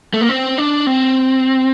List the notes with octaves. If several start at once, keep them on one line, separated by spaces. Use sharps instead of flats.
A3
A#3
C4
D4
C4